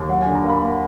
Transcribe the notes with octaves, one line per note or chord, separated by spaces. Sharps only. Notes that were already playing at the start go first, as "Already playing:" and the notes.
Already playing: D#2
F#3 F#5
D3 G#5
A#5
A#3
B5
A#3